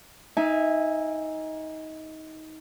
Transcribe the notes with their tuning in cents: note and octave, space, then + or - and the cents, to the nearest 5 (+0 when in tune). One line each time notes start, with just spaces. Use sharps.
D#4 +20 E5 +0 G#5 -15